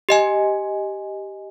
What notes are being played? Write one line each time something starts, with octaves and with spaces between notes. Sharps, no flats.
G4 D#5 G#5